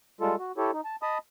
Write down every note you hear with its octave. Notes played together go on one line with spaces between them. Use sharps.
G3 G#3 F4 A4
F#4
E4 G4 A4 C#5
D#4
A5
D#5 A5 B5 D#6